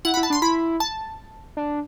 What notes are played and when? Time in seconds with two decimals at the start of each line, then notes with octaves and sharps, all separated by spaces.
0.05 E4 F#5
0.14 B5
0.17 E4
0.23 A5
0.30 D4 C6
0.42 E4 B5
0.80 A5
1.57 D4